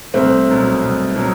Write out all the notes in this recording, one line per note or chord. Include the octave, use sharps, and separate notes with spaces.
C2 A3 C4
B2 F#3
C2
B2 F#3